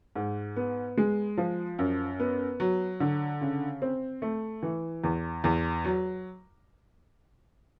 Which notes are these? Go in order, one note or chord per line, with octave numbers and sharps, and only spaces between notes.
G#2
B3
G#3
F3
F#2
B3
F#3
D3
C#3
C4
A3
E3
E2
E2
F#3